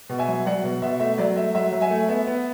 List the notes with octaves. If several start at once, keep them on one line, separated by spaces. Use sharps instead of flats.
B2
E5 G#5
F#3
F#3 D5 F#5
B2
B2 E5
A3 E5
F#3 D5
A3 E5
F#3 E5
F#3
E5 G#5
A3
B3 E5
B3